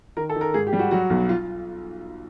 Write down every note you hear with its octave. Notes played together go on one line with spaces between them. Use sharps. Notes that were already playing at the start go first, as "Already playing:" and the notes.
D#3 A#4
A4
D#3
A#4
G#2 G#4
G4
G3
F#4
F#3 F#4
B1
F4